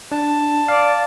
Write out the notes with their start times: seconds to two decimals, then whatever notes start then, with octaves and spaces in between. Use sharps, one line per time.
0.12 D4 A5
0.68 D5 F5